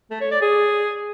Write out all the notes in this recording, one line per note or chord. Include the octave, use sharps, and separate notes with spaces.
A3
C#5
D5
G#4